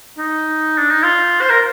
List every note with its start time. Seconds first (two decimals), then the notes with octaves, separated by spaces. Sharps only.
0.18 D#4
0.78 D4
0.91 D#4
1.03 F4
1.41 C5
1.49 A#4